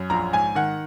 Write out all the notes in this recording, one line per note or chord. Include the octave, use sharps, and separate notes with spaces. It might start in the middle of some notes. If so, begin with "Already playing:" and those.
Already playing: F#2
A#1 A#5
G#2 G#5
D#3 F#5